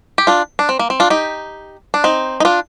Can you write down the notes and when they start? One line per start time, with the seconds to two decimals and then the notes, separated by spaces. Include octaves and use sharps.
0.18 G4
0.27 D4 F4
0.59 D4
0.69 C4
0.79 A#3
0.90 C4
1.00 D4 F4
1.10 D#4 G4
1.94 D4
2.04 C4 D#4
2.40 D#4
2.45 D4 F4